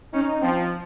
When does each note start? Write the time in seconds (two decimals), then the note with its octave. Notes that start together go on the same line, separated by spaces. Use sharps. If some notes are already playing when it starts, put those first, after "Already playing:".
0.13 C#4 D#4
0.42 F3 C4